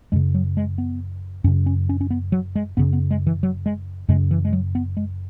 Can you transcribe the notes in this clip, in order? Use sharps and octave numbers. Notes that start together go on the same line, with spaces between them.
F#2 C#3 G#3
F#3
G#3
B3
F#2 C#3 C#4
C#4
C#4
C#4
B3
F#3
G#3
F#2 C#3 B3
B3
G#3
E3
F#3
G#3
F#2 C#3 G#3
E3
G#3
F#3
B3
G#3